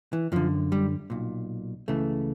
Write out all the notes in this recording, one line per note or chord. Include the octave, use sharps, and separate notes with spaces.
E3
F#2 D3 F3
G3
B1 A#2
C#2 C#3 E3 A3